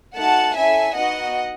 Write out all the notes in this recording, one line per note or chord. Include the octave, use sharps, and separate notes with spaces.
A3 D#4 F#4 F#5 A5
C#4 E4 A4 E5 G#5
B3 D#4 F#4 D#5 F#5